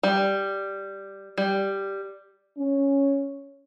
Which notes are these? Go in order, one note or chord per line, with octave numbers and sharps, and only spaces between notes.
G3
G3
C#4